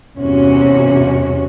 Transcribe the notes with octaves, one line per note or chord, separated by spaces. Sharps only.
E2 G2 C3 C#4 F#4 C#5